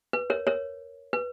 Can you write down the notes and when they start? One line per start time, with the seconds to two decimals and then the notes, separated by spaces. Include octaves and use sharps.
0.13 B4
0.30 A#4 C#5
0.47 A#4 C#5
1.13 B4